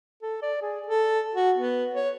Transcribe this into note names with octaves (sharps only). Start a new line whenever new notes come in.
A4
D5
G#4
A4
F#4
B3
C#5